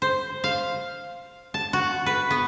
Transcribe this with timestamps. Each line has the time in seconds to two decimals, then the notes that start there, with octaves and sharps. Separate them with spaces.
0.02 C5
0.44 F5
1.54 A5
1.73 F#4
2.06 B4
2.31 B3